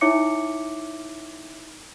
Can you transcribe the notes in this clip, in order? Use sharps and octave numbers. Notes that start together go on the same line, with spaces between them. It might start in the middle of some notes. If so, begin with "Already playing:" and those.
D#4 E4 C#5 E5 D6 C#7